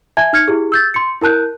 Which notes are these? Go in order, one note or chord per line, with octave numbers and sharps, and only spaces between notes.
E5 G#5 A5 G#6
D#4 F6 G#6 C#7
E4 G4 G#4
E6 G6 A6
C6 C#7
E4 A#4 A5 F#6 G6